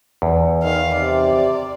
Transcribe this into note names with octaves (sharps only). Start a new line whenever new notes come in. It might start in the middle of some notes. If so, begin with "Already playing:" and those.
E2
D#3 F5
C3 D5